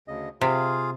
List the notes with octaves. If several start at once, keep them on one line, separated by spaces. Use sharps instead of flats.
D2 C#3 D#5
C3 F4 G#4 F5